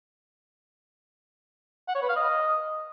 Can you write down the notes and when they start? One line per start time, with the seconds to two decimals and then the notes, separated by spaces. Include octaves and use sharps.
1.88 F#5
1.95 C#5
2.02 B4
2.09 F5
2.16 D#5